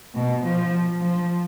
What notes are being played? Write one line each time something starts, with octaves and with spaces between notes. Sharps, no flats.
B2
F3
F3